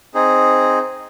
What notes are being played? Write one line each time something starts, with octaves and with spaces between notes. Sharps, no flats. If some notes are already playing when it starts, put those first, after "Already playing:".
C4 D#4 G#4